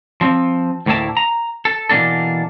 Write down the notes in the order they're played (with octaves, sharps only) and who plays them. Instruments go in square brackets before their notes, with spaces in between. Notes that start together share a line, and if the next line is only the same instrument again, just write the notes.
[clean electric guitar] F3 C4
D2 A2 A#3 E4 A5
A#5
A4
B2 E3 A#3 D4 A4